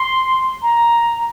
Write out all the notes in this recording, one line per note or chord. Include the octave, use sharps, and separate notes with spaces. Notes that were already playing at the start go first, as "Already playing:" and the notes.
Already playing: C6
A#5